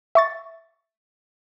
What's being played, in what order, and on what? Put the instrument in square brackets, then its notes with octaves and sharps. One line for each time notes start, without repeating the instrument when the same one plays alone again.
[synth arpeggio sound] E5 C#6 A6